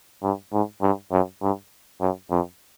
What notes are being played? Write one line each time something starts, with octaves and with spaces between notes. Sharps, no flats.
G2
G#2
G2
F#2
G2
F#2
F2